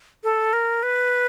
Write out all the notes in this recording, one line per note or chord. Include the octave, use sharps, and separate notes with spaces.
A4
A#4
B4